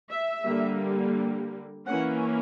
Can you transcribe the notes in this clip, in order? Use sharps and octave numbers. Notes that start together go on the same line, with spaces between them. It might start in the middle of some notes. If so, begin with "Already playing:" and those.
E5
D3 G3 A#3
E3 A#3 C#4 F#5